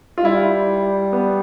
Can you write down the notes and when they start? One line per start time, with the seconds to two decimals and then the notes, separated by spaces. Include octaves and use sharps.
0.18 F4
0.24 G3 E4
1.13 B3